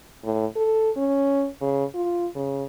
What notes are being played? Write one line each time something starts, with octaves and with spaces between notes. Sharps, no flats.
A2
A4
C#4
C#3
F4
C#3